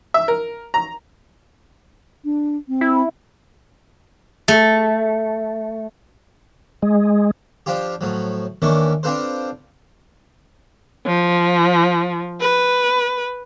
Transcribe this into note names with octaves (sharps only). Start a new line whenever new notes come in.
E5
A#4
A#5
D4
C4
E4
A3
G#3
F3 D4 F4 G4
A2 F3 F#3
D#2 D#3 E3 C#4 D4
C4 D4 F4 A4 B4 C5
F3
B4